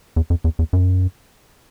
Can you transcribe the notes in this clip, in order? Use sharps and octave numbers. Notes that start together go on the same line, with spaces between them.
E2
F2
E2
E2
F#2